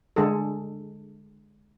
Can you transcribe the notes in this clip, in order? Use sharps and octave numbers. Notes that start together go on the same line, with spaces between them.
D3 G#3 D4 G#4 A4